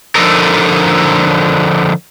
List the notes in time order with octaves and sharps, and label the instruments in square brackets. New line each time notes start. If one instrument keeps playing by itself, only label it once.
[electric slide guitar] D3 F3 D#4 A4 A#4